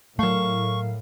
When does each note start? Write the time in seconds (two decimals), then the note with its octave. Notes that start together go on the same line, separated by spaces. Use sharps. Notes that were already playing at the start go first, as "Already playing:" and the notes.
0.19 A2 F#3 A3 A#4 F5 C#6